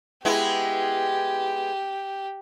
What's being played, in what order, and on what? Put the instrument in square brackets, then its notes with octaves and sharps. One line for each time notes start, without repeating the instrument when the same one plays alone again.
[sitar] G#3 B3 E4 [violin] G4